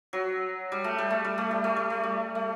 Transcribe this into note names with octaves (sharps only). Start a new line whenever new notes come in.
F#3
G3
A3
G3
A3
G3
A3
G3
A3
G3
A3
G3
A3